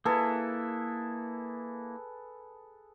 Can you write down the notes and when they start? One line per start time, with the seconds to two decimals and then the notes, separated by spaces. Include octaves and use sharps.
0.05 A#3 E4 G#4 A4 B4